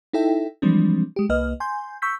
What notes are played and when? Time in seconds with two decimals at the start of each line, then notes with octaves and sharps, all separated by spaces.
0.13 D#4 E4 A4 E5 G5
0.62 E3 F3 G3 G#3 C4 D4
1.16 G#3 G4
1.29 C2 A#3 B4 D#5 F6
1.60 G#5 C6 G6
2.02 C#6 E6 G6 B6